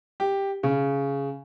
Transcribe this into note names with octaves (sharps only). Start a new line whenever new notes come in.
G4
C#3